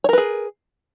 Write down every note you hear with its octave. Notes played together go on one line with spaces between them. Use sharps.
G#4 A#4 B4 C#5